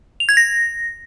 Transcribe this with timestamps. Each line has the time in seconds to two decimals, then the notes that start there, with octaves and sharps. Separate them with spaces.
0.20 F7
0.29 G#6
0.37 A#6